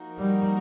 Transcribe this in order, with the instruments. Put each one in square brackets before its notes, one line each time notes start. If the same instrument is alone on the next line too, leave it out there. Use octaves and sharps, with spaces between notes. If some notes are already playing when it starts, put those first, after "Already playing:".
Already playing: [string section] F3 A#3 D#4 F#4 A#4
[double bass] G3